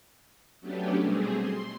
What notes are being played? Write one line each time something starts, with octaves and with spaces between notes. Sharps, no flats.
F#3 A3 B3 C#4 D4 G4
B2 G3 A3 C4 G#4
C6